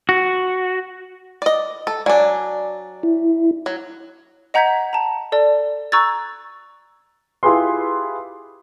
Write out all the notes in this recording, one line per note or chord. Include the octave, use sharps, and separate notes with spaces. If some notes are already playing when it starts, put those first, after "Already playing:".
F#4
D5 D#5
A4 A5
F#3 D4 D5 G#5
E4
F#3
D#5 F#5 A#5 G6 G#6 B6
A5 A#5
A4 D5 A5
A#5 C#6 E6 F#6 G#6 A6
E4 F4 G4 G#4 B4 C6